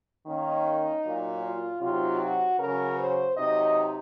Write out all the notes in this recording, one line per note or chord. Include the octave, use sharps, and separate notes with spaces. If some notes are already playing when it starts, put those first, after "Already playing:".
D#3 A#3 C#4 D#4
A#2 F#3 A#3
F4
C3 F#3 C4 D#4 F4
F#4
C#3 F#3 C#4 A#4
C5
C3 F#3 C4 D#4 D#5